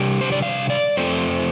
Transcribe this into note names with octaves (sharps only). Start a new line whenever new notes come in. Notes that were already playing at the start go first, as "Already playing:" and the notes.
Already playing: C3 G3 D4 G4
C5
D5
F5
D5
F2 F3 A3 C4 C5